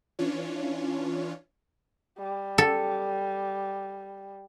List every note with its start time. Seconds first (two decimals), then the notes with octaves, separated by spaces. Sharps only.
0.19 E3 C#4 D4 F4 C#5
2.19 G3
2.58 A4